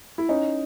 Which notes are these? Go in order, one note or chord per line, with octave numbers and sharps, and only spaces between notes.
E4
C#4 D#4